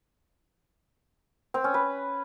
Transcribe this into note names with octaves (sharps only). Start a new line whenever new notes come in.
C4
C#4
B4